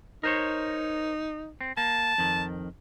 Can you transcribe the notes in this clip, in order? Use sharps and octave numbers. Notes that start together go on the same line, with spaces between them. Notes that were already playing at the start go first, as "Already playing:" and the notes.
D#4 A#4 C5 C#5
C4
A#3 A5
F2 D#3